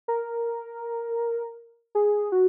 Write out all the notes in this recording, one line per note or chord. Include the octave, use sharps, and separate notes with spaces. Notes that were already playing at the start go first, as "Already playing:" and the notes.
A#4
G#4
F#4